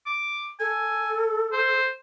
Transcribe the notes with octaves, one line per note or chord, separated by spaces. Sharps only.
D6
A4 G#5
C5